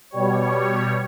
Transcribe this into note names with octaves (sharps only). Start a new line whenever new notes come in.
B2 G3 C#5